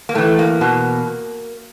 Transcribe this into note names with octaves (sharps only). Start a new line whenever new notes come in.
A#3
A2 E3 A3
A#3
E2 B2